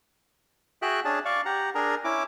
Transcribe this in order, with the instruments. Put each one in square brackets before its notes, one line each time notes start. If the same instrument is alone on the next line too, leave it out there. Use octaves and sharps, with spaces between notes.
[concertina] F#4 G#4 E5 G5 F#6
C#4 D4 G#4 A5
D5 F5 C#6
G4 F#5 A#5
D4 G#4 A#4 A#5
C#4 E4 D6